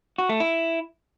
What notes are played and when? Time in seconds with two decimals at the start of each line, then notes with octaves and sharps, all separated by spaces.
0.18 F#4
0.29 A3
0.40 E4